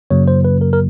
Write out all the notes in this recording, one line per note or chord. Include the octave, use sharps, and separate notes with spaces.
F#2 C#3 F#3 A#3 C#5
C5
B4
A#4
A#4